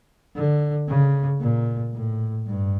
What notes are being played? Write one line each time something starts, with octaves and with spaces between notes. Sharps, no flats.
D3
C#3
A#2
A2
G2